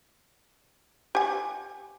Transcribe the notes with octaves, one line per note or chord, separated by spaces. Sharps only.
G4 G#5